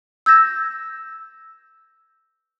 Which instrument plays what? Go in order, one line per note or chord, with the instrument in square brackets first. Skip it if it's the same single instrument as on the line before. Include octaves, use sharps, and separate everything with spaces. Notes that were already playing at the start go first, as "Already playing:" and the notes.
[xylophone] E6 G6 G#6 A#6 E7